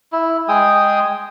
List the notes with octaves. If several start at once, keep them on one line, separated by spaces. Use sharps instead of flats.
E4
G#3 G#4 G5 D#6